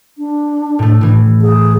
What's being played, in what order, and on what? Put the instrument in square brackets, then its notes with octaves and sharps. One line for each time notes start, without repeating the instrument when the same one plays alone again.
[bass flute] D4
[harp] A2 A3
A2 E3
[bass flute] G#4